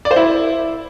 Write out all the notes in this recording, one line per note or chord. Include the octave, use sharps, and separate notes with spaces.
D5
C5
E4